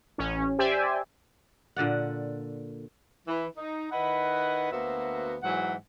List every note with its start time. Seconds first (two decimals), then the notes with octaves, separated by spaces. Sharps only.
0.18 A1 C#4
0.58 G4 C5 D5 E5 G5 G#5
1.76 A#2 D3 D5 F#5
3.27 E3
3.56 D#4
3.91 D#3 E4 B4 D#5 F#5
4.71 D2 A#3 B3 F#4 C5 E5
5.42 G#2 E3 F#3 F#5